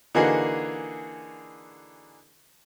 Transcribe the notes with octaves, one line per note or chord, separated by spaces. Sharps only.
D3 E3 A#3 D#4 F#4 G#4